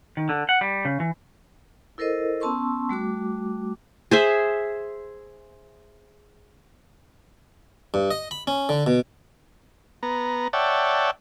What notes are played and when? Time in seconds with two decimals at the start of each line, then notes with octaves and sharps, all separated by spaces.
0.17 D#3
0.29 D3
0.49 F#5
0.61 G3
0.85 C#3
1.00 E3
1.98 E4 A4 A#4 C5 D#5
2.40 B3 C#4 A5 C6 C#6 E6
2.89 G3 A3 F#4 D6
4.11 G#4 C5 E5
7.94 G2
8.11 D#5
8.31 B5
8.47 C#4
8.69 D3
8.86 B2
10.03 B3 A#5
10.53 C#5 D5 E5 F#5 G5 A5